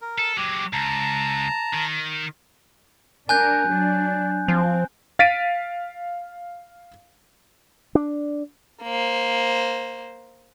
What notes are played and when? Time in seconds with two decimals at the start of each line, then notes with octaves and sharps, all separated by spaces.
0.01 A#4
0.19 A4
0.37 F#3 G#3 G4
0.73 C#2 A5 A#5
1.73 D#3
3.29 D4 A#4 G#5 F#6 G6
3.69 F#3 D4
4.48 F3 C4
5.19 F5 A6 B6 D7 D#7
7.95 D4
8.84 A#3 C5